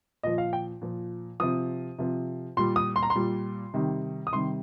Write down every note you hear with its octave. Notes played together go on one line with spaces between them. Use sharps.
A#2 F3 D#5
F5
G5
A#2 F3
C3 F3 D#6
C3 F3
A#2 G3 C6
D#6
C6
A#5
C6
A#2 G3
C3 D#3 G3
D#6
C3 D#3 G3 C6